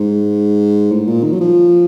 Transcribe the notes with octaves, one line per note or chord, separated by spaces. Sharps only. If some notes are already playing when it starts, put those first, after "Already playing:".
Already playing: G#2
A2
A#2
D#3
F#3
F3